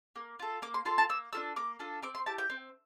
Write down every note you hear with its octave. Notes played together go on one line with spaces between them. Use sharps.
A#3
F4 A4
A#3 D6
C6
F4 A4 C6
A5
A#3 E6
D4 F4 A4 E6
A#3 D6
D4 F4 A4
C4 D6
C6
E4 G4 A5
G5
C4